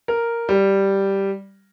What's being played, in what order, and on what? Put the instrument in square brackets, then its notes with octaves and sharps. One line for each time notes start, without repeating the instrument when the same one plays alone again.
[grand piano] A#4
G3